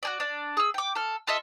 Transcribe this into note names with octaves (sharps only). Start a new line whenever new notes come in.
F#4 G#4 D5
D4 D5
G#4 E6
G5 D6
A4 F6
F4 A4 D#5 E5